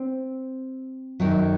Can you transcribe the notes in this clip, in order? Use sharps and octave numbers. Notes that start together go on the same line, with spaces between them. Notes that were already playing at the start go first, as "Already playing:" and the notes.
Already playing: C4
F#2 D#3 F#3